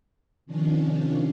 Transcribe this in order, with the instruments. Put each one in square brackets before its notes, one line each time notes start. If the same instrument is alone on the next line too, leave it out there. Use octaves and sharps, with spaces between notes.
[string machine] C3 D#3 F3 C#4 D4